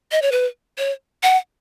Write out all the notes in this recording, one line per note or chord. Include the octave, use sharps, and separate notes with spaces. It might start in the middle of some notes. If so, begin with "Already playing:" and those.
D#5
C#5
B4
C#5
F#5